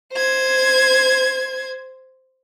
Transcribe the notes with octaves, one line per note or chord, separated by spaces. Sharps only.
C5 G#6